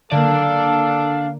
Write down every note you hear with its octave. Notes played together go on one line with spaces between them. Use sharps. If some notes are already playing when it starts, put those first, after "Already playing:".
D3 A#3 D4 A4 D5 F5